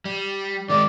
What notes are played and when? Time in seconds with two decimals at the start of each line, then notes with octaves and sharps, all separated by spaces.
0.05 G3
0.69 D#3 G#3 D5